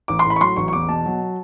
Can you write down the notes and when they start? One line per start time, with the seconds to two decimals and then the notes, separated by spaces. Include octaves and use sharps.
0.08 A1 D6
0.19 C6
0.25 A2 B5
0.36 C#6
0.41 F#3 C6
0.56 A1 C#6
0.68 C#6
0.73 E2 D6
0.89 B2 A5
1.06 F#3